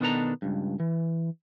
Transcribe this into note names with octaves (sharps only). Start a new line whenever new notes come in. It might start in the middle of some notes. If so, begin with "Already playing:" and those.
B2 D#3 B3 D4 A4 A#5
C#2 G2
E3